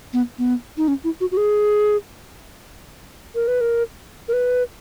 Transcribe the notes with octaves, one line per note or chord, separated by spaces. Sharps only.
B3
B3
D#4
C#4
E4
F#4
F#4
G#4
A#4
B4
A#4
A#4
B4